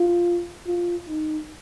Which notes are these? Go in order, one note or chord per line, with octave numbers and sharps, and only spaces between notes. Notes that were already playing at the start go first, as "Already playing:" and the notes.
Already playing: F4
F4
D#4